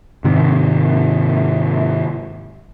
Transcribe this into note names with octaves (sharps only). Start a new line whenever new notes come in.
G#2 C3 D#3